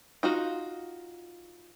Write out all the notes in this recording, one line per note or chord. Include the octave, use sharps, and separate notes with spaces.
D#4 F4 F#4